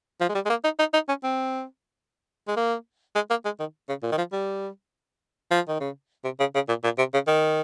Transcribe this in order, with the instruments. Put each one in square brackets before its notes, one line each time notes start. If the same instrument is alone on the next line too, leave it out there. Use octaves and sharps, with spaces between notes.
[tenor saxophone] F3
G#3
G3
G#3
A#3
D#4
D#4
D#4
C#4
C4
G#3
A#3
G#3
A#3
G#3
D#3
C#3
A#2
D#3
F3
G3
F3
D#3
C#3
C3
C#3
C#3
A#2
A#2
C3
C#3
D#3